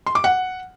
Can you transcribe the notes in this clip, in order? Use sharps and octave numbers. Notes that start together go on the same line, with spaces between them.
C6
D6
F#5